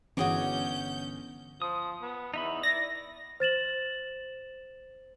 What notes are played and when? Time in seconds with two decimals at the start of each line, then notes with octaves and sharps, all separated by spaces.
0.17 G1 E3 C#4 F#4 G#4 C#5 D6 G6
1.62 F3 D#6
2.02 B3
2.34 E2 D#4 E5 B5
2.63 E4 D5 A#6
3.40 C5 A6 E7 F#7